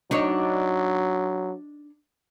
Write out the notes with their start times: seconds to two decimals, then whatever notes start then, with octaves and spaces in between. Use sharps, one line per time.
0.11 F#3 D4 D#4 C#5